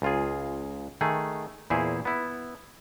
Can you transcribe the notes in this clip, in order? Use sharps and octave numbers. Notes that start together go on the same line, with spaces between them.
C#2 F4 G#4
D#3 A3 G#4
E2 A#2 E4 G#4 C5
B3 E4